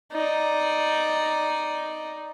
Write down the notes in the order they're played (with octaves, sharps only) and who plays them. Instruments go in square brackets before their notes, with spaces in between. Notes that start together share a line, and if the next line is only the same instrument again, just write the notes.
[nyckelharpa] D#4 D5